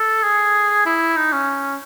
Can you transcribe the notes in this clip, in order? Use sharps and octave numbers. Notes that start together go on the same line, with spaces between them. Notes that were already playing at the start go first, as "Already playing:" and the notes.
Already playing: A4
G#4
E4
D#4
C#4